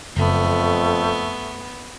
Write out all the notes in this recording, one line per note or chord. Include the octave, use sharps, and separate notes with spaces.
F#1 F2 A3 B3